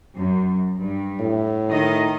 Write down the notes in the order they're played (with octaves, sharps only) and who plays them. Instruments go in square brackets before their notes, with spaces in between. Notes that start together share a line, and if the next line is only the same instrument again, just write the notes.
[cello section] F#2
G2
[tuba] A2
[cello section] D#3 D#5